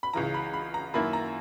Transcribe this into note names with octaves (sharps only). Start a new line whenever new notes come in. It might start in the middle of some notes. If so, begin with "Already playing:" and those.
B5
C#2 C#3 E3 A#5
B5
B5
A#5
F#2 D#3 A#3 E4 B5
A#5